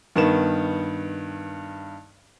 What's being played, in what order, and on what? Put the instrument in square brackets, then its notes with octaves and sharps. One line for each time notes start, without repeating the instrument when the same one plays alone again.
[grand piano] G2 D#3 B3 E7